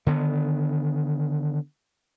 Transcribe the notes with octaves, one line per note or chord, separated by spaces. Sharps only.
D3 D#3 B3